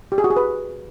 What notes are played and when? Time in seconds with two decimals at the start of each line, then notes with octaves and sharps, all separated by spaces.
0.12 G4
0.18 G#4
0.24 F#4
0.30 G#4
0.37 B4